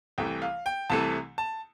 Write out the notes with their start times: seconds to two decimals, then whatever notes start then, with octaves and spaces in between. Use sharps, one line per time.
0.18 C2 C3 E3 A3 G5
0.42 F5
0.66 G5
0.90 C2 C3 E3 A3 A5
1.38 A5